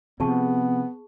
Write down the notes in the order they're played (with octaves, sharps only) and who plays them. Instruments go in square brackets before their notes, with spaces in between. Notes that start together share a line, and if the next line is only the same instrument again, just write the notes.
[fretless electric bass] C3 F3 [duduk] B3 [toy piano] G#4 A5 C#6